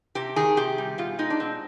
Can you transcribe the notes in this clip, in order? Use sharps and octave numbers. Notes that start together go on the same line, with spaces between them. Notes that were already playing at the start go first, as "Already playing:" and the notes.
C3 G4
D#3 G#4
C3 G4
G3
B2 F4
G#3 D#4
D4
B2 C4